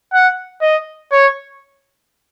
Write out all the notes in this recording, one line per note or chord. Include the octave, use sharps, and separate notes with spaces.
F#5
D#5
C#5